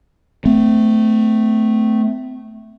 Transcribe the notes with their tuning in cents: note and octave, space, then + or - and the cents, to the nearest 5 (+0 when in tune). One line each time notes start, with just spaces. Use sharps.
A3 +0 C4 -35